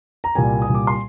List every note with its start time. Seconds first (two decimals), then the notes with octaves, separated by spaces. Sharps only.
0.24 A#5
0.35 C2 A#2 G3 G#5
0.62 D#6
0.68 C2 A#2 G3
0.75 D6
0.87 C6